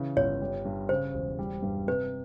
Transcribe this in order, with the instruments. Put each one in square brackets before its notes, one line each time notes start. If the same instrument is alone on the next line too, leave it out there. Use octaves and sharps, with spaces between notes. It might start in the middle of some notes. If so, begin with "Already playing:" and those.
Already playing: [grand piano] C#3 E3
[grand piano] G1 [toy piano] C#5
[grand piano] G3
G2
[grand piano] C#3 [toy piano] C5
[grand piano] E1
G3
G2
[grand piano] C3 [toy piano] B4